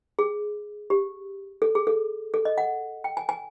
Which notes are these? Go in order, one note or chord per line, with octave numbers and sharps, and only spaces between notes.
G#4
G4
A4
G#4
A4
A4
D#5
F#5
G5
G#5
G#5